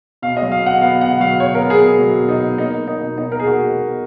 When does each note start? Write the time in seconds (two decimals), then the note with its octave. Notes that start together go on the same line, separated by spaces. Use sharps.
0.22 B2 F5
0.37 D#5
0.42 F#3
0.52 F5
0.62 B2 F#5
0.81 B3 F5
1.01 B2 F#5
1.20 F#3 F5
1.40 B2 C#5
1.55 A#4
1.60 B3
1.70 G#4
1.80 B2
1.99 F#3
2.19 B2
2.29 D#4
2.39 B3
2.58 A#3 D#4
2.78 A#3
2.88 D#4
2.98 B2
3.17 B2 D#4
3.32 A#4
3.37 A#3 G#4
3.46 F#4
3.57 A#3
3.76 B2